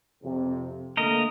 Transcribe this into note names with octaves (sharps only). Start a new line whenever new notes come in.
F2 C3
D3 A3 A#3 A#4 D#5